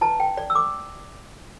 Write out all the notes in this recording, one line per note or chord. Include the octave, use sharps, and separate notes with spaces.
E4 B4 A5
G5
D5
E6
D6